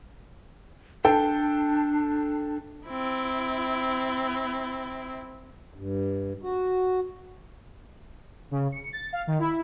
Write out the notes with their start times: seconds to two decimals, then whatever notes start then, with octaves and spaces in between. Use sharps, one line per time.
1.05 D4 A4 G5
2.87 C4 E4
5.74 G2
6.42 F#4
8.51 C#3
8.72 C#7
8.93 A6
9.13 F5
9.27 D#3
9.39 E4